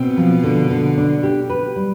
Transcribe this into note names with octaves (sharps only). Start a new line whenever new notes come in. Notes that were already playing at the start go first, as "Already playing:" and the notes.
Already playing: B2 C4
F3
D3
D3
D4
G4
B4
G3